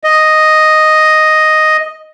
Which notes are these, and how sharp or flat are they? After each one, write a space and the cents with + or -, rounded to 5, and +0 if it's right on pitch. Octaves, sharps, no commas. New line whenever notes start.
D#5 +0